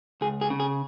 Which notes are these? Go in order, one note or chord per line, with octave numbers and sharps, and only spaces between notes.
C#2 G#4
G#4
C#3
G#4